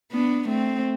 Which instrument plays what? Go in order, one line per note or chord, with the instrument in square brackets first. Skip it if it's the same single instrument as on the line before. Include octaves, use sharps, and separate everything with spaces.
[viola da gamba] B3 D4
A3 C4